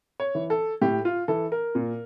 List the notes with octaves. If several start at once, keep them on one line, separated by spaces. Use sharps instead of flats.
C#5
E3
A4
A2 G4
F4
E3 A4
A#4
A#2